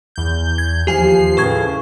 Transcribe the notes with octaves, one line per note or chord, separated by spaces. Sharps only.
E2 G6
G#6
D#2 F3 G4 G#5 C7
A2 C#3 B4 C#6 G#6